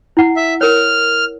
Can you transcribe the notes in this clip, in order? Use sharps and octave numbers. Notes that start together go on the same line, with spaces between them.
E4 F#5
E5
A#4 C#5 F6